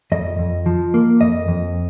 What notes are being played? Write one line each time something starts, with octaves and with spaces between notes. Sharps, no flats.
F2 D#5
F2
F3
A#3
F2 D#5
F2